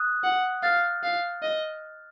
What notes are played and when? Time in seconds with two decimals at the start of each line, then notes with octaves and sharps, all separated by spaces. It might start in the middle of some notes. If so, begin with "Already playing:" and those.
Already playing: D#6 F#6
0.23 F#5
0.63 F5 F6 A6
1.03 F5
1.42 D#5